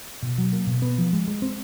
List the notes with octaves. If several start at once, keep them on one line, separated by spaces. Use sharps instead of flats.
B2
F#3
A#3
B2
B3
F3
G#3
G#3
C4